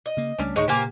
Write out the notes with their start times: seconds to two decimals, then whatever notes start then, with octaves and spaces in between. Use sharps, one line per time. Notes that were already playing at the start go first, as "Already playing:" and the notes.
0.06 D#5
0.17 C#3 A#3
0.38 C#2 G3 A3 C#4 D4
0.56 D2 A2 D#3 G#3 D#4 C#5 D#5
0.68 A#2 C#3 A#3 G4 C5 G#5